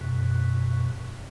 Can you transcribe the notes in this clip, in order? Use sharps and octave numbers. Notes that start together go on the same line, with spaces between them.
F#2 B2